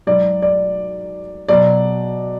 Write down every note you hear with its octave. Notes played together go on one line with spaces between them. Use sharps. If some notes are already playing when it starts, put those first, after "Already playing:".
G#2 F#3 D5
D5
B2 F#3 D5